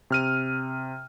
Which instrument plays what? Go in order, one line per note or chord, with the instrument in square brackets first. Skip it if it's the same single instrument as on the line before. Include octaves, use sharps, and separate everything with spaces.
[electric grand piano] C3 F6 D#7